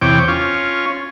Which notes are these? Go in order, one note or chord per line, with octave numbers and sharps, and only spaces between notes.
E2 C3 C#5 G5 D6
C#4 F4